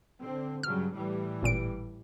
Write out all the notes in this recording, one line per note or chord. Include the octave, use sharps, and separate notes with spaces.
D3 C4
G2 C#3 F#3 F6
A2 E3 G3
G#1 A#2 D7